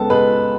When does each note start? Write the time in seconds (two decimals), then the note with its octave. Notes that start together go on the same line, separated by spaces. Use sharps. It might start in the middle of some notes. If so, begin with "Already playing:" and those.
Already playing: C#2 B3 A4 A5
0.10 G#3 B4 B5